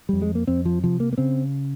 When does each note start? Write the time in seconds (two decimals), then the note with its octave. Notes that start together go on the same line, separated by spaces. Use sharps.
0.09 F2 G3
0.22 G#3
0.35 A#3
0.47 F2 C4
0.65 F3
0.83 C3 F3
1.00 A#3
1.13 A#3
1.18 C#3 C4